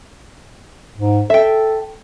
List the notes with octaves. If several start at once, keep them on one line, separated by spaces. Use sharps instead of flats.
G#2
A4 E5 G5